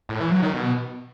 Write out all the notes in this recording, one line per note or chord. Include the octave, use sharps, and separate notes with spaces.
A2
E3
F#3
D#3
B2